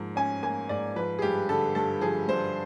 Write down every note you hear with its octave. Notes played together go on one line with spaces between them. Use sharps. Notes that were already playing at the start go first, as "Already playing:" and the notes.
Already playing: G#2 F3 A#3
C#4 G#5
A#3 G#5
G#2 D5
F3 B4
G#4
G2 G4
D3 A4
G2 A4
F3 G#4
G2 C5